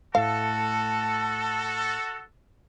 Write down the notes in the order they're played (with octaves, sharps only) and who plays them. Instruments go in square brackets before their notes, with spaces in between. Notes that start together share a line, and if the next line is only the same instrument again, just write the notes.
[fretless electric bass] A2 A3 [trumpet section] F#4 A4 [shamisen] F5 [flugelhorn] A5